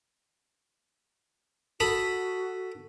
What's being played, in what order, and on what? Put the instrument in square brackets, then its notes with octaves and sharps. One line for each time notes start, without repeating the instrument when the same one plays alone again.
[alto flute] F#4 [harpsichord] A4 B5 D#6